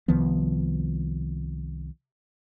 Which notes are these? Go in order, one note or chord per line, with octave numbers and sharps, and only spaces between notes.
C2 D#3 F3 B3